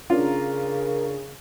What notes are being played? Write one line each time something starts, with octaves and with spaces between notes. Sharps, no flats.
C#3 C#4 D4 F4 A#4